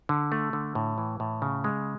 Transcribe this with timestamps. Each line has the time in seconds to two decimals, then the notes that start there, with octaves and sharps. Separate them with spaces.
0.09 D3
0.32 A3
0.53 D3
0.75 A2
0.98 E3
1.20 A2
1.42 C#3
1.64 G#3